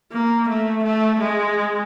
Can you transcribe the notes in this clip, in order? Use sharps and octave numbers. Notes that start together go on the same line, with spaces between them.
A#3
A3
A3
G#3